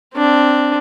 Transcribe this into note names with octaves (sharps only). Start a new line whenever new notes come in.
C4 D4